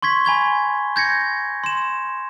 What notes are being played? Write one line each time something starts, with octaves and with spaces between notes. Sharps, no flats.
C6 C#6 G#6 B6
G#5 B5 G#6 G7
G6 G#6 A#6 C#7
C6 E7